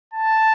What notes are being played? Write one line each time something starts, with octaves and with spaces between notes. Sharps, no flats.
A5